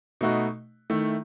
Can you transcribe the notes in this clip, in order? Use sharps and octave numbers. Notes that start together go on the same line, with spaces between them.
B2 A3 D#4 F#4
D#3 A3 E4